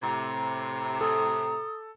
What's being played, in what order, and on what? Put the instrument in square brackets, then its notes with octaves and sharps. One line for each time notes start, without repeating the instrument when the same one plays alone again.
[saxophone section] A2 C3 [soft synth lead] A#5
[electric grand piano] A4 [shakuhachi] D#6